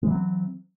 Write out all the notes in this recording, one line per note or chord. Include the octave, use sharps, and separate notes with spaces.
E3 F#3 G#3 C4